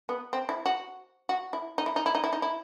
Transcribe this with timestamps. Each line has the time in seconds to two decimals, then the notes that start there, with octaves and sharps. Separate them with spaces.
0.09 B3
0.33 C4
0.49 E4
0.66 F#4
1.29 F#4
1.53 E4
1.78 D#4
1.86 E4
1.96 D#4
2.06 E4
2.15 D#4
2.24 E4
2.33 D#4
2.42 E4